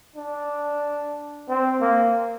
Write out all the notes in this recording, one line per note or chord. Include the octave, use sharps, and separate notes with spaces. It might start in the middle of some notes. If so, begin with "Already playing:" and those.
D4
C4
A#3